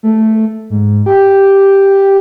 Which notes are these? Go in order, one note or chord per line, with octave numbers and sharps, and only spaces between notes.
A3
G#2
G4